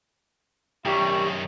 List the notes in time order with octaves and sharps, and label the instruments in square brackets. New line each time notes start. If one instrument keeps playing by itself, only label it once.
[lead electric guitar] F#2 D#3 [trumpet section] G3 E4 C#6 [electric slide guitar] G4